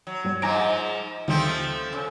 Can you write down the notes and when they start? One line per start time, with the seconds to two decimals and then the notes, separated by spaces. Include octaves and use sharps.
0.07 F#3
0.24 G2 G3
0.42 G#2 F3 G#5 A#5 D6
1.28 D2 D#3 F3 G3 A3 C4
1.93 C#3